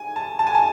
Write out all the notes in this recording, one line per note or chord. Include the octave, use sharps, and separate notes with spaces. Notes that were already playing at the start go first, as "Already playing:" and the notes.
Already playing: G#5
A5
A5
G#5
A5